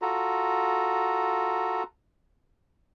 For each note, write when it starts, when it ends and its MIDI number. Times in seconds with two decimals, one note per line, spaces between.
0.02 1.83 65
0.02 1.83 66
0.02 1.83 69
0.02 1.83 82